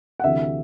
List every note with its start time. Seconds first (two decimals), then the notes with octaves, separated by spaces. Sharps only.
0.20 F#5
0.24 D2 C3 E3 E5